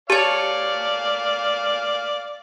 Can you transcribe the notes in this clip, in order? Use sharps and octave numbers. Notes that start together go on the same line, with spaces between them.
G4 A4 C#5 D5 F5 A5